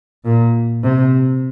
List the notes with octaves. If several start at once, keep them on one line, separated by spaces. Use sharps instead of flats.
A#2
C3